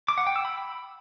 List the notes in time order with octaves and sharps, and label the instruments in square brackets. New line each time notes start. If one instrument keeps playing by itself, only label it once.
[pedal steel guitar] D6
F#5
G5
E6
B5